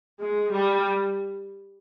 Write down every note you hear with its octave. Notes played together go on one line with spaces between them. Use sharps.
G#3
G3